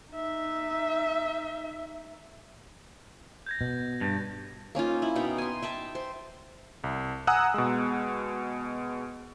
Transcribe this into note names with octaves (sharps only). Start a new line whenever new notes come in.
D#4 E5
G6 G#6 A#6
B2
G2
A#3 C#4 D#4 F4
E4
B2 D#4 G5
G#5 C6
E5 G5 A5
C5
C2
F#5 G#5 A#5 D#6 E6 F#6
B2 G#3